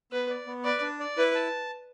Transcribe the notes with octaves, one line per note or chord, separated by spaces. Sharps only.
B3 B4
D5
B3
B4 D5
D4
D5
E4 B4
A5